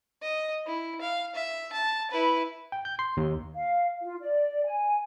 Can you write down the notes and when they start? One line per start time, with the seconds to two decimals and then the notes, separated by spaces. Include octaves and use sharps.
0.22 D#5
0.66 E4
1.01 F5
1.35 E5
1.72 A5
2.11 E4 B4
2.72 G5
2.85 G6
2.99 C6
3.17 D#2
3.55 F5
4.02 F4
4.20 D5
4.65 G#5